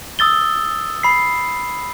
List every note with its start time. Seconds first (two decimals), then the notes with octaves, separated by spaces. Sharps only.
0.19 D#6 E6 A6 G7
1.03 B5 C7